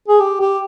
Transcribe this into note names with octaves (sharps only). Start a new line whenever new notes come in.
G#4
G4
G4